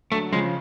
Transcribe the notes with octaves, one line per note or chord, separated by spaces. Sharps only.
D3 F#3 A3
C#3 F3 G#3